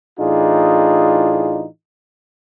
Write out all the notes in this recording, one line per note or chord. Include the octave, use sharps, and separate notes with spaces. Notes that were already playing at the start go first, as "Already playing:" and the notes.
A2 E3 D4 D#4 F4 G#4